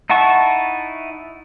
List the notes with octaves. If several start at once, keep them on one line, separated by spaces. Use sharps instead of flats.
D#4 E4 F#5 A5 C#6